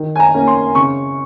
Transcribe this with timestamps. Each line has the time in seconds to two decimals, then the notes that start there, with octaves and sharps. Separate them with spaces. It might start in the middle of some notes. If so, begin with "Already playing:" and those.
Already playing: D#3
0.16 G#5
0.20 A#5
0.34 A#3 C#4
0.47 C6
0.75 C#3 C#6